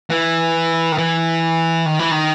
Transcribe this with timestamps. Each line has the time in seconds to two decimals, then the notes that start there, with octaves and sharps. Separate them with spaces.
0.10 E3
0.92 D#3
0.98 E3
1.86 D#3
1.99 E3
2.11 D#3